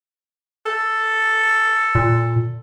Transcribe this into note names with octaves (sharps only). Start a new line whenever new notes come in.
A4
A#2